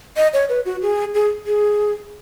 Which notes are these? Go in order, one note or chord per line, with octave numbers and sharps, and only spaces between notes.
D#5
C#5
B4
F#4
G#4
G#4
G#4